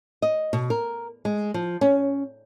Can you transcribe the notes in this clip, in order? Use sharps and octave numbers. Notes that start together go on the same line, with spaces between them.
D#5
B2
A#4
G#3
F3
C#4